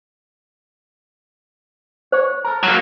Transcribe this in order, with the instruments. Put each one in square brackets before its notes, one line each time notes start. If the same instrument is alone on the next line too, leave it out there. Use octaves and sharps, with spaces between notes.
[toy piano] C5 [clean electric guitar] C#5
[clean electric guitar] A4 A#4
[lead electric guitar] F#3 A#3